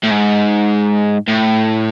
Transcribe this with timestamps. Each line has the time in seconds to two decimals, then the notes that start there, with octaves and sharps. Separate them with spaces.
0.03 A2
0.10 G#2
1.28 A2